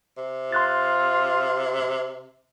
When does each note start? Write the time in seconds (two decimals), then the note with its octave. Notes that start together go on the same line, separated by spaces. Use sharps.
0.17 C3
0.52 F4 C6 F#6 A6